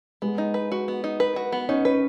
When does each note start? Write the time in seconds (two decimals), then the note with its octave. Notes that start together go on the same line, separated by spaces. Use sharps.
0.22 G#3 B3
0.38 D#4
0.54 B4
0.72 F#4
0.88 B3
1.04 D#4
1.20 B4
1.36 F#4
1.52 B3
1.69 C#4 D#4
1.85 C#4 B4